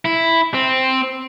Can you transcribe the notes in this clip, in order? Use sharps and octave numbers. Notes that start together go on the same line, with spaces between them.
E4
C4